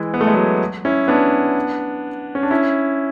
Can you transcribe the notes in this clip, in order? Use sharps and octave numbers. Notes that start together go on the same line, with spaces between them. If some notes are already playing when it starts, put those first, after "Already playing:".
Already playing: E3 G#3
B3
A3
G#3
F#3 A3
C#4 E4
B3 D4
C#4
D4
C#4 E4